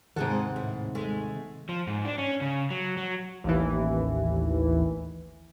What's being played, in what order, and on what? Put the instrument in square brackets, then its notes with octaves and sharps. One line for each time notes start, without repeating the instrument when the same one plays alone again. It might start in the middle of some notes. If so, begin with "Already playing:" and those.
[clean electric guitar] D#2 C3 [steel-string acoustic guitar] G#2 F#5 [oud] G#3 G#4 A4
[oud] A2
G#3 A3
[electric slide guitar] F3
G#2
D4
C#4
C#3
F#3
F#3
[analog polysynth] A1 D#2 E3